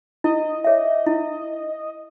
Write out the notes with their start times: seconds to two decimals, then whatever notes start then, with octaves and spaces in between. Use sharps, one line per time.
0.24 E4 D#5
0.64 G#4 C#5 E5
1.06 E4